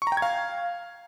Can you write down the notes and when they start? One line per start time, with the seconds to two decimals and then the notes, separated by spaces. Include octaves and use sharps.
0.02 C#6
0.07 A#5
0.12 G5
0.17 G#6
0.22 F5